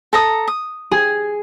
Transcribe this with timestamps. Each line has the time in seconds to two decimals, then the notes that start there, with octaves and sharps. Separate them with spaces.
0.13 A4 A#5 D#6
0.48 D#6
0.91 G#4